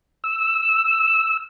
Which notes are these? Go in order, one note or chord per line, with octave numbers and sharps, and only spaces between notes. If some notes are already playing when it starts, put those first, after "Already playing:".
E6